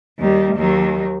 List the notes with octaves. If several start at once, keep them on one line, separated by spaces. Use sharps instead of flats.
D#2 G3
D#2 F#3